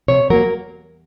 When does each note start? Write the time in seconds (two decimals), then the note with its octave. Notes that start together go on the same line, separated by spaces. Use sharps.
0.08 C3 C#5
0.30 F#3 A#3 A#4